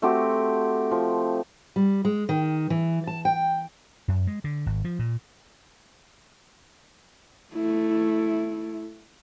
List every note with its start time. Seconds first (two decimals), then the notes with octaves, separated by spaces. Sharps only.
0.02 A3 C4 F#4 G4
0.91 F3
1.76 G3
2.05 G#3
2.29 D#3
2.70 E3
3.07 A5
3.25 G5
4.08 F#2
4.27 G#3
4.44 D3
4.66 G#1
4.85 F3
4.99 A#2
7.54 A3 E4